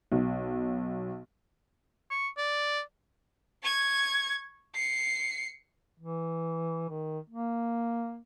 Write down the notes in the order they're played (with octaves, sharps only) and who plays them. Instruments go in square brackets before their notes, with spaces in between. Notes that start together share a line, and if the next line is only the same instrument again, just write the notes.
[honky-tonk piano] B1
[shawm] C#6
D5
[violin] C#6 G#6
C7 C#7
[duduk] E3
D#3
A#3